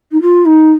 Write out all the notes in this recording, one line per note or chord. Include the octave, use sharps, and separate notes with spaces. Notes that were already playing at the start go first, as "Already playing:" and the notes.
D#4
F4
D#4